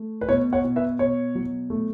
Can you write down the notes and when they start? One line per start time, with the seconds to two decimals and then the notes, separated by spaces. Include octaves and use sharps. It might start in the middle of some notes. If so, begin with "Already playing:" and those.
Already playing: A3
0.21 B4
0.29 B2 C#5
0.53 C#5 F#5
0.65 B2
0.76 B4 E5
0.99 B2 C#5
1.35 F#3
1.70 A3